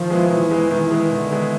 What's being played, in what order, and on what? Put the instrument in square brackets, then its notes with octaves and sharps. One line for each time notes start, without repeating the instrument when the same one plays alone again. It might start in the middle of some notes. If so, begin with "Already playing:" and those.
Already playing: [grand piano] D#3 [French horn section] F3
[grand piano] G#3 B3 E4
[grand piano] D#3 [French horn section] E3
[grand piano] G#3 B3 E4
[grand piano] D#3 [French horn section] E3
[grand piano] G#3 B3 E4
[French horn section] D3 [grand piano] D#3
[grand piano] G#3 B3 E4